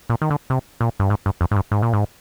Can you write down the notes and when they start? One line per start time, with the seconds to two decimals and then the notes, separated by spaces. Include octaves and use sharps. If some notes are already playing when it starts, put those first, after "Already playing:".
0.10 A#2
0.22 D#3
0.30 D3
0.50 C3
0.81 A#2
0.99 G2
1.10 G#2
1.26 G2
1.41 F2
1.51 G#2
1.56 G2
1.72 G#2
1.82 A#2
1.93 G#2